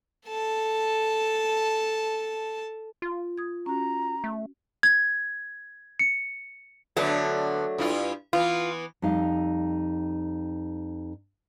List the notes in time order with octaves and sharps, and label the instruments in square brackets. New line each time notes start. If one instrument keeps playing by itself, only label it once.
[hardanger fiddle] A4 A5
[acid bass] F4
[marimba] D#6 G#6
[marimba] C#4 F#4 [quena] A#5
[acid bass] A3
[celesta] G#6
C#7
[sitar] D3 B3 [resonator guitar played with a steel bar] F#3 A3 D4
[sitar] G2 E4 F4
[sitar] E3 B3 [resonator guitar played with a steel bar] F4
[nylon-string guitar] F2 G3 D#4 F5